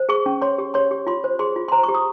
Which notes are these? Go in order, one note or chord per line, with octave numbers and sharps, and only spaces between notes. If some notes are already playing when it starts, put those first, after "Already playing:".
Already playing: C5
G#4 C#6
C#4
C#5 C6
G4
C#5 C6
G4
F4 C6
C5
G#4 C6
F4
C6
C5 A#5
C#6
G4
D#6